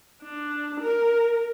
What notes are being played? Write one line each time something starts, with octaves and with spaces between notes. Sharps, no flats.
D4
A#4